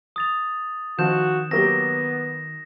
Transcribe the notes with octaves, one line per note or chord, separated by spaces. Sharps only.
D#6 A6 F7
D#3 F3 F#4 G6 E7
F#3 A#3 B3 G4 A#6